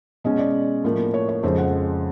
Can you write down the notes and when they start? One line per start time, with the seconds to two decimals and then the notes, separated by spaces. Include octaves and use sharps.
0.24 B2 G#3 C#4 D#5
0.39 D5
0.84 A2 F3 A#3
1.14 C#5
1.29 C#5
1.43 F2 C#3 F3 G#3 C5
1.58 F#5